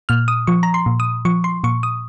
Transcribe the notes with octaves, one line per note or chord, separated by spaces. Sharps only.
A#2 F6
D#6
F3 C#6
A#5
C6
A#2
D#6
F3 C#6
C6
A#2 C#6
D#6